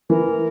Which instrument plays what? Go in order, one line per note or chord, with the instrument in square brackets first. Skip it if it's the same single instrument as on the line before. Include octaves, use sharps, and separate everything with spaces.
[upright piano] E3 [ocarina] A#4